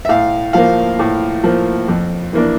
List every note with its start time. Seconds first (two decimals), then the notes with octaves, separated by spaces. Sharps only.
0.05 E5
0.09 A2 F5
0.53 F3 A#3 F5
0.99 A2
1.44 F3 A#3
1.88 F2
2.33 E3 A#3 D4